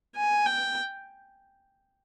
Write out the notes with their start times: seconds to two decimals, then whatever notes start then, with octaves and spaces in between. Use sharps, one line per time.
0.15 G#5
0.46 G5